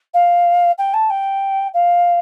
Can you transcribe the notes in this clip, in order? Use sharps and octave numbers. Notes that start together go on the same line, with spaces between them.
F5
G5
A5
G5
F5